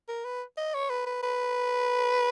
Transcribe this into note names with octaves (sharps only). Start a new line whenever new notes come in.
A#4
B4
D#5
C#5
B4
B4
B4